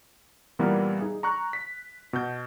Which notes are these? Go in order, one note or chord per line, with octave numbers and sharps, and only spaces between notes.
A#2 E3 G3 B3 A#4
D#4 G#4
A#5 C#6 F#6
B6
B2 G6